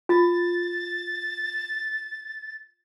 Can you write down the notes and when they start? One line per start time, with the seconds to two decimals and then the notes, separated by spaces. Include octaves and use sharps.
0.09 F4 A6